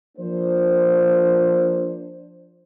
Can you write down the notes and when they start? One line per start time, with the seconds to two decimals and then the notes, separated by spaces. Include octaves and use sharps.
0.18 F3 A#3 D4 C5